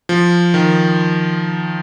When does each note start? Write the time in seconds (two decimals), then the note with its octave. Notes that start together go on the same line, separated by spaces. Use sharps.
0.09 F3
0.54 D#3